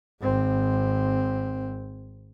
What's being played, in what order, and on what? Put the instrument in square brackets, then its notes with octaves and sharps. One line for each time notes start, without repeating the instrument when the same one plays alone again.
[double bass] G#1 C4